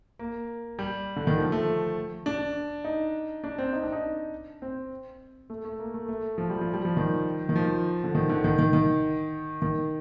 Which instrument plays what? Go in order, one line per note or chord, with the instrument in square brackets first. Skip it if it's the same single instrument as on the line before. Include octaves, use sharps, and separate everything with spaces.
[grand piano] A#3
G3
D3
D#3
F3
A3
D4
D#4
D4
C4
D#4
D4
D#4
C4
A3
A3
A#3
A3
A3
F3
G3
F3
G3
F3
D#3
D#3
F3
D3
D#3
D3
D#3
D#3
D#3
D#3